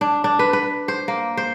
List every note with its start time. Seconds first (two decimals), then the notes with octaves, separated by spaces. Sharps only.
0.01 D4
0.24 D4
0.39 B4
0.53 B4
0.88 C5
1.08 A#3
1.37 C5